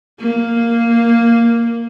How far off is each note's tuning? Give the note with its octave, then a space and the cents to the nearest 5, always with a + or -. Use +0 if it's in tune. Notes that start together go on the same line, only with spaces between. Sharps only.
A#3 -5